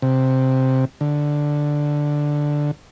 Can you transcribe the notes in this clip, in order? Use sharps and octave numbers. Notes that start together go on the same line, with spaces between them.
C3
D3